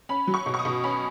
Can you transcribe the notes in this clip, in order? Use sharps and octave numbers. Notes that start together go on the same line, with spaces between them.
C#4 B5
F#3
C#6
B2
C#6
D#6
B2
C#4 B5